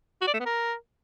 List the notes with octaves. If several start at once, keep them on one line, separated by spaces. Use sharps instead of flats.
F#4
D5
A3
B3
A#4